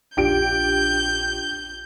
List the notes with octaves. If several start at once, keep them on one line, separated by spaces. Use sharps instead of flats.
A#1 D4 F4 G4 G6 D7